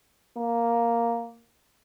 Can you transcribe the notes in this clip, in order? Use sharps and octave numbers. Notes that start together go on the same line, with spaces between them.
A#3